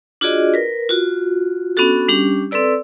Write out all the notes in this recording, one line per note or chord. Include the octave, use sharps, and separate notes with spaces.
D4 F4 F#4 G#4 D5 D#5
A#4 B4
F4 F#4
B3 C#4 D4 F#4 A4
G3 C#4 D4 G4
C4 A4 B4 D5 E6